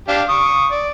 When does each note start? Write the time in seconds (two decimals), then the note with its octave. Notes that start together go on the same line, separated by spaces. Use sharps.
0.08 D4 G4 F5
0.29 C#6 D#6
0.71 D5